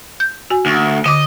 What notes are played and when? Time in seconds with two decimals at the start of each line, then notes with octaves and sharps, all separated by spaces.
0.20 G6
0.50 F#4 G#5
0.66 D2
1.06 D3 D#5 D6